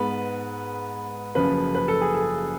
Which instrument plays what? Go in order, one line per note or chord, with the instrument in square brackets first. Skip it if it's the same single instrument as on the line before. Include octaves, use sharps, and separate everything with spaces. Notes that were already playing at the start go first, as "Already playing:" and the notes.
Already playing: [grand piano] G#2 G#3 B3 [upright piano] B4
[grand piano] F#1 F#2 C#3 F3 [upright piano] B4
[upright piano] B4
A4
G#4
A4